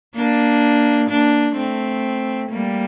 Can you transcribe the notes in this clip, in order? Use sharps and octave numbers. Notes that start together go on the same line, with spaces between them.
A#3 D4
A#3 D4
A3 C4
G3 A#3